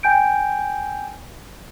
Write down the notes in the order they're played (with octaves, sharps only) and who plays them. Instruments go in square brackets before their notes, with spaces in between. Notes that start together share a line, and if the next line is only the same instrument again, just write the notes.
[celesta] G5 G#5 G6 D7